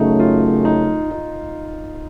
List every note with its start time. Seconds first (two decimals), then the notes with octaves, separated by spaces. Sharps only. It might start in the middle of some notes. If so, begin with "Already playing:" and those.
Already playing: F#2 C#3 A3 D#4
0.19 F4
0.65 D#4
1.11 D#4